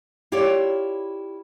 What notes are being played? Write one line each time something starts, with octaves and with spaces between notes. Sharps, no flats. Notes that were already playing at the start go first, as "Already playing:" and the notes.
E4 F4 G4 C#5 D5